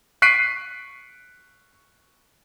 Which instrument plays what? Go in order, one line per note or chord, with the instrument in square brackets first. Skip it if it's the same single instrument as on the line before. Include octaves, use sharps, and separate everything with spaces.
[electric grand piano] C#6 F#6 B6 C7 D7 D#7